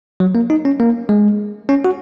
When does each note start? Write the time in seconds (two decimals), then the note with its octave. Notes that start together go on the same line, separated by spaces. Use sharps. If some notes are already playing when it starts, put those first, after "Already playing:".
0.20 F#3
0.35 A#3
0.50 D#4
0.65 C#4
0.80 A#3
1.09 G#3
1.69 C#4
1.85 F#4